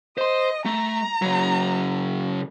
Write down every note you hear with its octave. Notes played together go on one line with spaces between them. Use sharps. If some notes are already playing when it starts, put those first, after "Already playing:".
C5 D#5 C6
A3 A#5
C#3 F#3